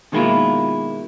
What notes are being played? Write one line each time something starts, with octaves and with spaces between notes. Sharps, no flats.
B2 D#3 G#3 A#3 E4 F4